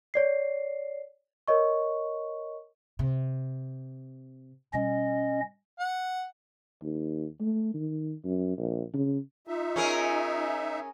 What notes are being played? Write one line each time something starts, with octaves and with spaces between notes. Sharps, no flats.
C#5 D5 C7
A#4 C#5 D#5 C#6
C3
B2 G3 C#4 D#5
F#5
D#2
A3
D#3
F#2
A#1
C#3
D#4 F4 E5
C#4 G#4 A#4